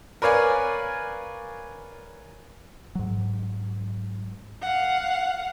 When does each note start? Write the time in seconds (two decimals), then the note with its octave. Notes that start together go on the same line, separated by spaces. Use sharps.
0.22 A#4 B4 C#5 D5 F5 G#5
2.95 G#2 F#3
4.62 F5 F#5